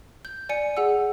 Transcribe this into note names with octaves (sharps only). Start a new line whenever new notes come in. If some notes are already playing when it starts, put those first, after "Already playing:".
G6
D5 G#5 C#7
G#4 F#5 E6